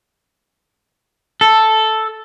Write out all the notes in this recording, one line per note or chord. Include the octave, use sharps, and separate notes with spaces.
A4